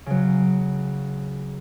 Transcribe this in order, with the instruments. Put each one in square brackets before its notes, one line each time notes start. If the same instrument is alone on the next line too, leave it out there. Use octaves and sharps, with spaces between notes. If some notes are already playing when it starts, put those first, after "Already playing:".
[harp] C#3 F#3